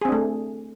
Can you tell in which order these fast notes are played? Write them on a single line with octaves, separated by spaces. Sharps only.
G#4 C4 D4 A3